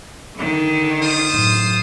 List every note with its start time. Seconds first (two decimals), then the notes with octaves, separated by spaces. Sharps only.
0.36 D3 D#3
1.01 F4 C5 D#6
1.30 F#2 A2